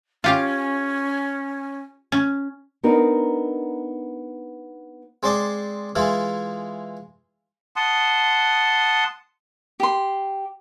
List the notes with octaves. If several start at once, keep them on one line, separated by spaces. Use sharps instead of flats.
C#4 F4 G4 F5
C#4
B3 C4 D4 D#4 F#4 A#4
G#3 C4 D5 C6 D6
E3 G#3 E4 F4
F#5 A5 C6 D#6
G4 C6